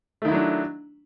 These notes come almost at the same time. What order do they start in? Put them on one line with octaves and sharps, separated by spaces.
A3 D#3 E4 F#3 D4